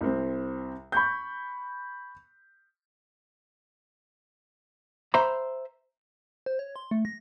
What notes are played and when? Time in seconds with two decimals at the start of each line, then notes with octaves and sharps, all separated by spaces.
0.01 C2 C4
0.92 B5 C#6 G6
5.14 C5 E5 A#5 B5
6.46 C5
6.59 C#5
6.76 C6
6.91 A3
7.05 A#6